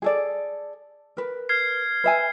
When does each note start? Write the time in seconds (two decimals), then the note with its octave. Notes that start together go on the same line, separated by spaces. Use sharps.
0.02 G#4 A4 D5
1.17 A#4 B4
1.49 F6 G#6 C7
2.04 B4 E5 G#5